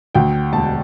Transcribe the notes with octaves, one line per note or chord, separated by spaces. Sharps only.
D2 G5
E1 A5